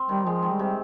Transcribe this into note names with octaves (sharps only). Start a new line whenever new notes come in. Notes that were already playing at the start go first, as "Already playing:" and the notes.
Already playing: C4
D#3 G3
F3 G#3
D#3
G3
C3